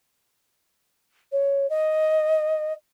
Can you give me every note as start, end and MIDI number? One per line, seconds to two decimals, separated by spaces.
1.31 1.69 73
1.69 2.72 75